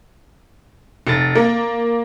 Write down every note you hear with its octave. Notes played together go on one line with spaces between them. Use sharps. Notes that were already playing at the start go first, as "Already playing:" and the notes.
F1 A6
A#3